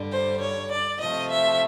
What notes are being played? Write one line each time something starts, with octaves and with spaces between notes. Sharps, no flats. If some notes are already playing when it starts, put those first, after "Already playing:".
Already playing: G2 D3 G3
C5
C#5
D5
C3 F3 A3 D#5
E5